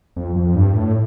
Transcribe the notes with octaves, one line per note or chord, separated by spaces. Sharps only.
F2
F2
G2
A2